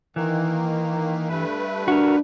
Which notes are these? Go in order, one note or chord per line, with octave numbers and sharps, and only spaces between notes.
D#3 E3 A#3
G2 A3 B4
D4 F#4 A#4